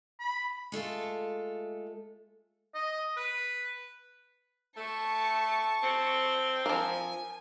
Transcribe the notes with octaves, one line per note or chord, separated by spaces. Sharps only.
B5
G#3 A3 F4 A4
D#5
B4
A3 A5 C#6
C4
F3 A#4 G#5